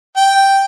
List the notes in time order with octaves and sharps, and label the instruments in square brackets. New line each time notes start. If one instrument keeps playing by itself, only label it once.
[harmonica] G5